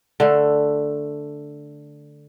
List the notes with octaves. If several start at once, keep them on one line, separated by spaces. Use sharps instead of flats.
D3 A3